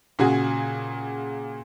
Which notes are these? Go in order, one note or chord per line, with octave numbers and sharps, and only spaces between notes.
A#2 C#3 F#4 G#4